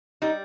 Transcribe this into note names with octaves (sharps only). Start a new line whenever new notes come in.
G3 D#4